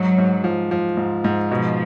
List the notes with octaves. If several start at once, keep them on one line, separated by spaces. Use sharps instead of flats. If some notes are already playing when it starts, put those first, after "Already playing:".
Already playing: G#2 F#3
G#2
F3
F3
G#2
G#2
B2 F3